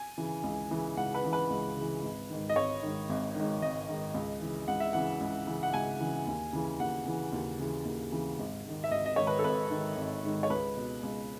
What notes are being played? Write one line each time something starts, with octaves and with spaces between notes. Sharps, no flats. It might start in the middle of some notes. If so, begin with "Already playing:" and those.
Already playing: G#5
C#3 E3
C#2
C#3 E3
C#2 F#5
B4
C#3 E3
B4
C#2
C#3 E3
G#1
G#2 D#3
D#5
G#1 C#5
G#2 D#3
G#1
G#2 D#3
G#1 D#5
G#2 D#3
C#2
C#3 E3
C#2 F#5
E5
C#3 E3 F#5
C#2
C#3 E3
F#5
C#2 G#5
C#3 E3
D#2
C#3 E3
D#2 F#5
C#3 E3
D#2
C#3 E3
D#2
C#3 E3
G#1
G#2 D#3
E5
G#1 D#5
D#5
G#2 D#3 C#5
B4
A4
G#1 B4
G#2 D#3
G#1
G#2 D#3
C#5
C#2 B4
B2
C#2